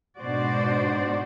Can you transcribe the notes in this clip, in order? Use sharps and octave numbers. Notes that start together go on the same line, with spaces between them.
G#2 B2 D4 F#4 C5 D5